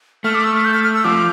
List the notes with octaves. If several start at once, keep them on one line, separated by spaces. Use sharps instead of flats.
A3 F6
D6
E6
F6
G6
F6
F6
E6
F3 D6